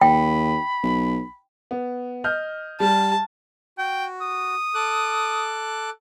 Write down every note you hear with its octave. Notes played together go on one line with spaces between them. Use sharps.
D#2 G5 B5
B1
B3
D#5 F6 G6
G3 A5
F#4 G5
D#6
A4 D6 F#6